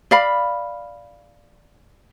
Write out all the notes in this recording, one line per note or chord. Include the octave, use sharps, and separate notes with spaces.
D5 F5 B5